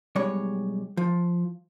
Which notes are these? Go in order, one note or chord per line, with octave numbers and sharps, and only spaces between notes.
B1 G3 G#3 C#5
F3